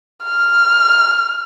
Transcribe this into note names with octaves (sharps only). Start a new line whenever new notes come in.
F6